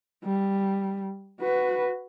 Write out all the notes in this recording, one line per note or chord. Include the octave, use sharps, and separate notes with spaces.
G3
F#4 B4